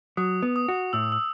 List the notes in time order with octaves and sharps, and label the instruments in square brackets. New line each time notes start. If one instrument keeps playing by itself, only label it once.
[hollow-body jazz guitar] F#3 [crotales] D#6
[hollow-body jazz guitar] B3
[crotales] D#6
[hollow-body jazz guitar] F#4
[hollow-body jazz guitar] A2 [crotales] E6
[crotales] E6